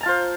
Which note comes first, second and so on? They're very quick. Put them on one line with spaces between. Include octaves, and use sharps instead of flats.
A#5 A5 F4 C5